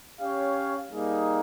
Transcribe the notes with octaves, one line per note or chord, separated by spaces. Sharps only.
C#4 G4 C#5 F5
G3 A#3 D#4 G#4